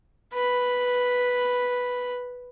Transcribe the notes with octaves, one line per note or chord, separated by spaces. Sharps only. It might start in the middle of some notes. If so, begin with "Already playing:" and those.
B4 B5